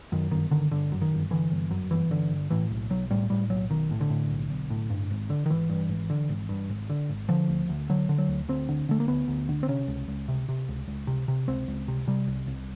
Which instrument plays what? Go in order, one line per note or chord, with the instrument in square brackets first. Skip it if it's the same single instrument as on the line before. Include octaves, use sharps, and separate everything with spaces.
[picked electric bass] F#2 D#3
G1 D#3
D3 D#3
G1 D3
F#2
D#3
G1
D3 E3
G1
F#2
G1 E3
D3
G1
A2 E3
B1
B1 F#3
A2 G3
A2 G3
B1 F#3
B1 D#3
A2
D3
A2
B1
B1
A2
G2
G#1
D3
D#3
G#1 E3
G2
G#1
D3
G#1
G2
G#1
D3
G#1
D3 F3
D2
D2
D3 F#3
D3
F#3
D2
D2 C4
D3
D3 A3
A#3
D2 B3
D2
D3
C4
C3 C#4
C#2
C#2
C3
C3
C#2
C#2
C3
C3
C#2 C4
C#2
C3
C3 G3
C2
C2